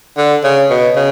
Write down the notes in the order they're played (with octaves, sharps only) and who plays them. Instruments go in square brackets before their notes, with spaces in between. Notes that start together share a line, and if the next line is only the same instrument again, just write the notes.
[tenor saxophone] D3
C#3
B2
C#3